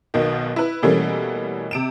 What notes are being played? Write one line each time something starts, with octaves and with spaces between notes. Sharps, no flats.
B1 B2 D#3
E4 B4
B2 E3 G3 A3 A#3 C#4
C3 D7 E7